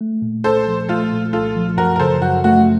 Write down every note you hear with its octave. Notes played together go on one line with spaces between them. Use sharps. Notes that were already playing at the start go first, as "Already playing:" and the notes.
A3
A#2
C2 A4 C5
F3
A3 F4 A4
A#2
C2 F4 A4
F3
F#2 F#4 A#4
A#4
C#3 A4 C5
F#2 F#4
A3 F#4